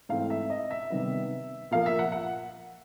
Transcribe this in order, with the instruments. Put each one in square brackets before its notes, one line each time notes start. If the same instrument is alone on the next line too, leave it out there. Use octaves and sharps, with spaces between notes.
[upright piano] G#2 E3 A3 C4 F5
E5
D#5
E5
C3 D#3 G3 B3
A#2 F3 A#3 F5
E5
F#5
F#5